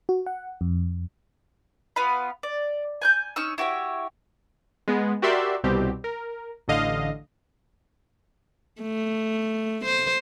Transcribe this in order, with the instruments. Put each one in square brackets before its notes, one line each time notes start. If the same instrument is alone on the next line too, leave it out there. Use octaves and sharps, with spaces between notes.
[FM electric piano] F#4
F#5
F2
[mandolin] B3 F4 F5 B5
D5
G#5 F#6 G6
C#4 D#4 C#6 E6
E4 F#4 G4 C#5
[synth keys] G#3 B3
F#4 G4 A#4 D5 E5 C6
C2 B2 G3 C4 G4
A#4
A1 D3 D#5 F5
[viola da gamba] A3
C5